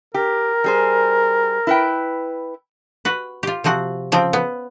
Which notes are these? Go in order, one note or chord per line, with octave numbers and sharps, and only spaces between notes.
G4 A#4
G3 G#4 C5
E4 B4 G5
F#4 B4
F4 G4
C3 F3 C4 F#4
C#3 F3 C4 G5
B3